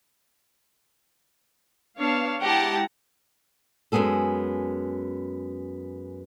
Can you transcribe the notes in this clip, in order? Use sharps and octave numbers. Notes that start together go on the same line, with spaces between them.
B3 D4 C#5 F5 A5
G#3 E4 G4 F#5 A5 A#5
F#2 G#3 B3 G#4 A4